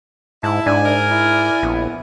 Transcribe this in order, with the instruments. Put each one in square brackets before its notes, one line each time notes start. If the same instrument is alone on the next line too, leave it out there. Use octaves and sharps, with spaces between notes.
[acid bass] G#2 [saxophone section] E4 [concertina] A5
[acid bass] G#2 [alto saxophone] D4 [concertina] G#5
[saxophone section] A#4 D5
[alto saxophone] E4
[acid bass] A#1 [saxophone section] B3